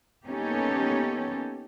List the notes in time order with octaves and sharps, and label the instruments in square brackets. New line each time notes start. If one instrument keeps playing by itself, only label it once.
[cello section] A#3 B3 C#4 D#4 G4 A4